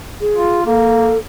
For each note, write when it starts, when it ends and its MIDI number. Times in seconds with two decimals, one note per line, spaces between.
0.21 0.61 68
0.35 0.64 65
0.66 1.12 58
0.66 1.18 69